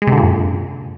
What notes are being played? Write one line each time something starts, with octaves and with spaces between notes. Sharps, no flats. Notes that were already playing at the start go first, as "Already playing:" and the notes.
G#3
C3
D3
A#2
F#2